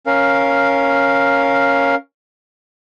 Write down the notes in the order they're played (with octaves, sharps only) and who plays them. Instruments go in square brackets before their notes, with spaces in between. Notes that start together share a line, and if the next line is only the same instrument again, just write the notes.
[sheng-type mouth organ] C#4 A#4 F5